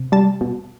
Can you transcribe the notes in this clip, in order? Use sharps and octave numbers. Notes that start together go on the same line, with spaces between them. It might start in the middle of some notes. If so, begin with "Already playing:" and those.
Already playing: C3
G3 A5
B2